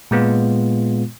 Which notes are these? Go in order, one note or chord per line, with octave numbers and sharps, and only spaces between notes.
A#2 G#3 B3 F4